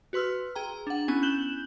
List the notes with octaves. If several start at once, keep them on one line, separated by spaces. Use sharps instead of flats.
F#4 B4 C6 E6 F6
G#4 G5 A#5
D4 F#5
B3 C#4 E4 G#5
F#6 G6 E7 F#7 G7